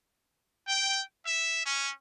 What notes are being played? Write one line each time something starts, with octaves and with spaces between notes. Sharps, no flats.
G5
E5
C#4